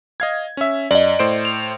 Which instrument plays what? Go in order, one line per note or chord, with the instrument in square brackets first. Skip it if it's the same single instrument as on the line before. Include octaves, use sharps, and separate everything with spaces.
[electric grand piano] D#5 F5 G#6
C#4 E5
[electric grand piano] F#2 [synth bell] D5 D#5
[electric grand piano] A2 C5 D7
[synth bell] F7